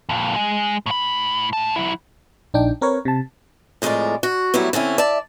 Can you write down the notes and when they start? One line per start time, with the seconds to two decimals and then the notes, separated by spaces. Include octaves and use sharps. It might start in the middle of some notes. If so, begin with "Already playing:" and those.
0.09 F2 A#2
0.36 G#3
0.86 A2 B5
1.53 A2 A5
1.76 F#3 E4
2.54 A#1 D4 D#4 G5
2.81 C4 A#4 B4 C#5
3.05 C3 A5
3.82 F2 A2 G#3 B3 A#4 D5
4.23 F#4
4.54 A2 F#3 G3 B3 E4
4.73 D3 C4 C#4 E4
4.98 D5 E5 A5